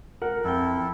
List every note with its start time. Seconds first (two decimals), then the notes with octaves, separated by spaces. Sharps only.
0.22 A#4 F#5
0.44 F2 C4 E4 A4 G5